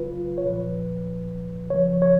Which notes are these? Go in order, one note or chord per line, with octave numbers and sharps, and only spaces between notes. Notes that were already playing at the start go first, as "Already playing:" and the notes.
Already playing: C#3 F#3 F4 B4
C#5
A#2 F3 B4
C#3 F3 C#5
C#5